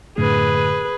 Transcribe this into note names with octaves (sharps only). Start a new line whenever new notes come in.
F#2 A2 D3 G#4 B4